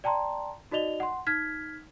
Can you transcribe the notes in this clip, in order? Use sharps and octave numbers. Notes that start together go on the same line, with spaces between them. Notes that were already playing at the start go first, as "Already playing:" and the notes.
D5 G5 A5 A#5 C6
D#4 F#4 D5 D#5 F7 G7
F#5 C6
D#4 F6 G#6 B6